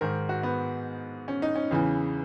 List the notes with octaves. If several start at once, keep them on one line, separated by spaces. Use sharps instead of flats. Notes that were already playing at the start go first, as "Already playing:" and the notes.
G#2 D#3 A#4
F#4
B3
C#4
D#4
C#4
E2 C#3 E3